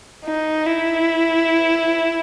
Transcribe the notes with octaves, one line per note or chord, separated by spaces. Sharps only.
D#4
E4